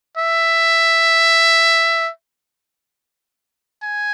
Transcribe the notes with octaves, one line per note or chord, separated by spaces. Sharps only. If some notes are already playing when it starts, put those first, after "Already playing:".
E5
G#5